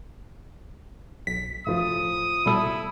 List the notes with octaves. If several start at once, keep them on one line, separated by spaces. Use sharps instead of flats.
B1 B6
A2 F3 D#6
B2 G3 E4 A4